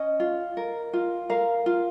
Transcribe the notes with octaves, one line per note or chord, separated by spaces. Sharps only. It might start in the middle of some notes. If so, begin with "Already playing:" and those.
Already playing: C#4 D#5
F4
A#4
F4
A#4 F5
F4